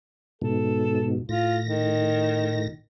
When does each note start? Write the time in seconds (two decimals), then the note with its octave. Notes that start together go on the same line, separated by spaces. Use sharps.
0.42 G#2 B2 A4
1.29 A2 F4 A#6
1.65 D#3